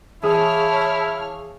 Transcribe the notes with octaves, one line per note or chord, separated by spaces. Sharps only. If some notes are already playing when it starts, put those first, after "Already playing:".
E3 E4 G#4 C#5 F5 A5 D#6 F6